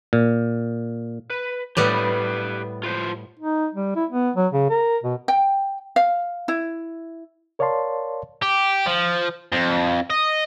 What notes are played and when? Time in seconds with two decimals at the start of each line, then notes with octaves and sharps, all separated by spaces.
0.13 A#2
1.30 B4
1.77 A2 G3 B3 G4 B4
2.83 F4 B4 C5
3.39 D#4
3.75 G3
3.96 E4
4.10 B3
4.36 F#3
4.52 C#3
4.70 A#4
5.04 B2
5.28 G5
5.96 F5
6.48 E4
7.59 A#4 C#5 D5 F5 A5 C6
8.42 G4
8.86 F3
9.52 F2
10.10 D#5